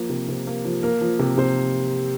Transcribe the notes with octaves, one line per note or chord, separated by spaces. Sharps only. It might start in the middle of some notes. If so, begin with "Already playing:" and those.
Already playing: F3 A#3
C3
C3
A#3
F3
A#3 A#4
F3
C3
C3 C5